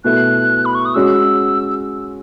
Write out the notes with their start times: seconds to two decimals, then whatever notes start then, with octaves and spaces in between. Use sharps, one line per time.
0.04 B2 A3 E4 F#6
0.65 B5
0.75 C#6
0.85 D#6
0.94 G#3 C#4 F#4 E6